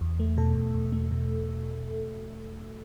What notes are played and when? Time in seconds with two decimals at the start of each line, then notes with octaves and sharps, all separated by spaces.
0.01 E2
0.20 A3
0.37 B2 A4
0.55 E2
0.74 E2
0.92 A3
1.11 B2